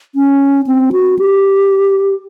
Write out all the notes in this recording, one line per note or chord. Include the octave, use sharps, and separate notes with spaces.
C#4
C4
F#4
G4